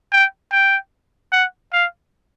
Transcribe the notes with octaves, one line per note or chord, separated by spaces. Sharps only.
G5
G5
F#5
F5